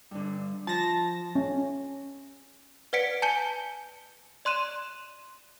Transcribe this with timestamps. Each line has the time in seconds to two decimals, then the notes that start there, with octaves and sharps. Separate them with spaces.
0.11 G2 D3
0.67 F3 A5 A#6
1.35 C#4
2.93 B4 D5 F#5 B6 C#7 D7
3.22 G#5 A5 G6 C#7 G7
4.45 D5 C6 F#6 D#7 E7